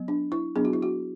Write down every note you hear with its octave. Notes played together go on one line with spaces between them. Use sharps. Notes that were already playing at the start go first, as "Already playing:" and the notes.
Already playing: F#3 B3
D4
E4
F#3 B3 D4 G#4
F#4
E4
F#4